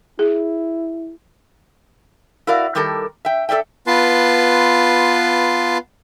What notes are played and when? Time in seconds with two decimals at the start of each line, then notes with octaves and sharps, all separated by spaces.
0.19 E4 G#4
2.47 E4 F#4 A#4 D5 F5
2.75 D#3 G3 G4 A4 A#4
3.25 E5 G5
3.49 A4 A#4 D5 E5 G5
3.87 B3 F4 B4 A5 C6